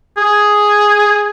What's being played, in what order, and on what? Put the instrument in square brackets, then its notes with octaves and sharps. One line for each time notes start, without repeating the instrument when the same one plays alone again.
[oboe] G#4